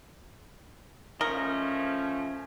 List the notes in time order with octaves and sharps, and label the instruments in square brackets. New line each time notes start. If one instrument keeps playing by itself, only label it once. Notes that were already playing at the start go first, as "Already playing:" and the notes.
[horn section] F3 A3 [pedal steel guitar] C#4 D#5 [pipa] A#4